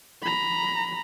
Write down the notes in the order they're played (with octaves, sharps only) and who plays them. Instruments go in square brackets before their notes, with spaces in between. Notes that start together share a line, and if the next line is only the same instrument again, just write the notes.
[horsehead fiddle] A#5 B5